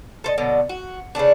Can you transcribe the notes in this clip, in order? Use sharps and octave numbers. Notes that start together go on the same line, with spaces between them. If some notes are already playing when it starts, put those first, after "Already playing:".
A4 C5 D#5
B2 D3 F#3
F#4
C#3 E3 A3 D4